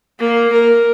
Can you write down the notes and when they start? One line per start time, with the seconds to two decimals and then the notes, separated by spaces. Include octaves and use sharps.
0.19 A#3
0.52 A#4